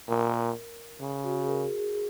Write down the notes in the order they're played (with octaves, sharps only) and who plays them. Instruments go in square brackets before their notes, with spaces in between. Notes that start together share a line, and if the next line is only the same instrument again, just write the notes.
[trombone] A#2 [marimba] A#4
[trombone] C#3
[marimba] F#4
G#4
A#4
G#4
G#4
G#4